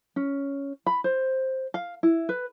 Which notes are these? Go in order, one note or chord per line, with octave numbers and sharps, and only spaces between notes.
C#4
B5
C5
F5
E4
B4